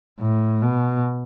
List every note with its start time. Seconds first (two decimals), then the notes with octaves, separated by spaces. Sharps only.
0.20 A2
0.62 B2